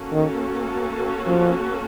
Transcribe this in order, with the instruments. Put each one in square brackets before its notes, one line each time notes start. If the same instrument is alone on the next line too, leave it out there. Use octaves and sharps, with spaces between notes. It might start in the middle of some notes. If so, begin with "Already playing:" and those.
Already playing: [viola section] A#3 C#4 F#4 A4
[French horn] D#3
F3